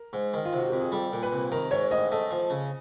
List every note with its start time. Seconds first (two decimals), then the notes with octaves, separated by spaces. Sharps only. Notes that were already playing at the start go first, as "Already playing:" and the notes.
Already playing: A#4
0.13 G#2
0.34 D#3
0.45 F4
0.53 C3 F#4
0.68 F2 G4
0.80 G#4
0.92 G3 A4
1.13 A#2
1.23 B4
1.32 C2
1.52 D#3 A#4
1.71 G#2 C#5
1.91 A1 D#5
2.11 A3 D#5
2.31 F3
2.50 C#3